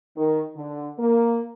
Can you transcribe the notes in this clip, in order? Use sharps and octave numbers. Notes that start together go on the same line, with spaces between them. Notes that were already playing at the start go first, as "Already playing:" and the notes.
D#3
D3
A#3